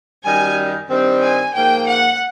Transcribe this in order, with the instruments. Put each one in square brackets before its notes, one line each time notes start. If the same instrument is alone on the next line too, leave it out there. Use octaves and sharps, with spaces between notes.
[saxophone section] F#2 D#3 G3 [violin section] G#5
[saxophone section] G2 D#3 G3 C4
[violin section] G#5
[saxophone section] G#2 F3 A#3 [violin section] G5
[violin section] F#5